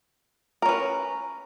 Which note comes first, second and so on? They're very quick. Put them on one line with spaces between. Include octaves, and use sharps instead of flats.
A#4 C#4 B4